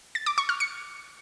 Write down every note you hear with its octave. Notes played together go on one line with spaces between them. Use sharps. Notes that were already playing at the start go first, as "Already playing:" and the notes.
A6
D6
C#6
F6
C#7